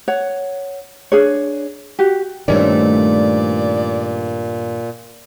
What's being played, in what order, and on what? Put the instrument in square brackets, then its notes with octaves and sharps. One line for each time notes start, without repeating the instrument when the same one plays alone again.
[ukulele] C#5 F#5
D4 G#4 C#5
F#4 G4
[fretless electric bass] G2 D#3 [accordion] A#2 [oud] A3 C4 C#4 [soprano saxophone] D5